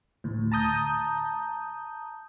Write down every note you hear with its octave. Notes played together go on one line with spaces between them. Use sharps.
D2 A2
A5 A#5 D#6 G6